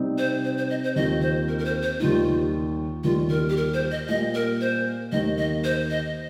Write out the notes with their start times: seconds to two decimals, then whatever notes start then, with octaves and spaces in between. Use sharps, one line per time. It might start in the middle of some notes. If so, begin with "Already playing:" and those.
Already playing: C3 G3 C4 D#4
0.18 C5
0.45 C5
0.58 C5
0.70 D#5
0.84 C5
0.96 D#2 D#3 C4 F4 D#5
1.22 C5
1.48 A#4
1.59 A#4
1.65 C5
1.83 C5
2.00 D#2 D#3 G3 D#4 F4
3.04 D#2 D#3 G3 F4
3.30 A#4
3.50 G4
3.57 A#4
3.74 C5
3.91 D#5
4.09 A#2 G3 A#3 D#5
4.35 A#4
4.61 C5
5.12 D#2 D#3 A#3 D#5
5.38 D#5
5.64 C5
5.90 D#5